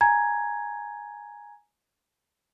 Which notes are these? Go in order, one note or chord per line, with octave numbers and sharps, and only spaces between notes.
G#5 A#5 G#6